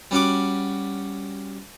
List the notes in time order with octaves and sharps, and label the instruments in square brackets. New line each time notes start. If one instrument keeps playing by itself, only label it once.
[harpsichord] G3 C#4 F#4 D6